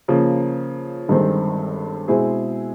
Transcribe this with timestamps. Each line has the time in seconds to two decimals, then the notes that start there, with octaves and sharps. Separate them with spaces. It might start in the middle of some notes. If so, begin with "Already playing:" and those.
0.08 C#3 F3 A#3
1.09 G1 G2 D#3 G#3 C4
2.08 B2 G#3 C4 E4 G#4